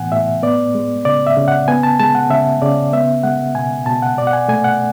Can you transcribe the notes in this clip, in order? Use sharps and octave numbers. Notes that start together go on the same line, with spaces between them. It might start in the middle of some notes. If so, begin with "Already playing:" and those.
Already playing: A2 E3 B3 F#5 G#5
A2 E5
B3 D5
G#3
C#3 D5
E5
C#3
F#5
B3 G#5
A5
G#3 A5
F#5
C#3 E5
C#3 D5
B3 E5
G#3 F#5
B2 G#5
B2 A5
F#5
B2 D5
F#5
G#5
A3 G#5
F#5